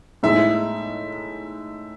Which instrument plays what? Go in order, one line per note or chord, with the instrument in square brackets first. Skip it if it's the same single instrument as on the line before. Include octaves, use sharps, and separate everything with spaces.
[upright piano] A2 G#3 D#4 [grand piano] E5